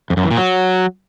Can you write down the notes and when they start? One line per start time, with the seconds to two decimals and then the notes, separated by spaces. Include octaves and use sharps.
0.10 F2
0.17 F#2
0.24 E3
0.31 A#2
0.37 F#3